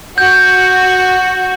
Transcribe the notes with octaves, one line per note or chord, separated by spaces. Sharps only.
F#4 G6